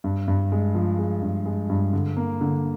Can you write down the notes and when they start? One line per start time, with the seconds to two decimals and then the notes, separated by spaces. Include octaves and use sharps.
0.04 G2
0.28 G2
0.52 G#3
0.75 F3
0.99 G#3
1.22 G2
1.46 G#3
1.70 G2
1.93 D3
2.17 A#3
2.41 D3